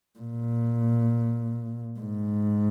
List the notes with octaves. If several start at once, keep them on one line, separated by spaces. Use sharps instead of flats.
A#2
G#2